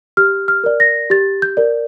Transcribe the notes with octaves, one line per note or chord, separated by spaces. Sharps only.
G4 F6
F6
A#4 D5
A#6
G4 A6
G6
A#4 D5